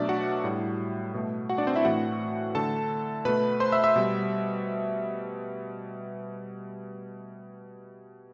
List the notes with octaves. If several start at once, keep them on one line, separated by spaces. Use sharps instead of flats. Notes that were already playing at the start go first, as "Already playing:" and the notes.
Already playing: B2 F#3 A3 D4 D5 E5
F#4 F#5
A2 G3
B2 A3
F#4 F#5
D4 D5
C4 C5
E4 E5
A2 E3 A3 F#4 F#5
D3 A3 A4 A5
B2 A3 B4 B5
C5 C6
E5 E6
E5 E6
B2 G3